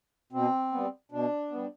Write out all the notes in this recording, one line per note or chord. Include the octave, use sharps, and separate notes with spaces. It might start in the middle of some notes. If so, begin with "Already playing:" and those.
B2 C4
G3 B3
B2 D4
G3 B3